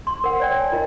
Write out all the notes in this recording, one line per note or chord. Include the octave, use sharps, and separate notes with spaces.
C6
A#4 F#5
C#5 D5 G5
G#5
F4 A#4 D#5